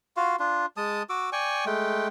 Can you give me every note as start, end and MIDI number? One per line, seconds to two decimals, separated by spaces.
0.17 0.36 65
0.17 0.36 66
0.17 0.36 77
0.40 0.66 62
0.40 0.66 65
0.77 1.03 56
0.77 1.03 81
0.77 1.03 87
1.09 1.30 66
1.09 1.30 86
1.09 1.30 88
1.33 1.65 74
1.33 1.65 79
1.33 1.65 80
1.33 1.65 85
1.66 2.08 56
1.66 2.08 57
1.66 2.08 79